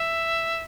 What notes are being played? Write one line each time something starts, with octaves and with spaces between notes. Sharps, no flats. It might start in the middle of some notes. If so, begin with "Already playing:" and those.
Already playing: E5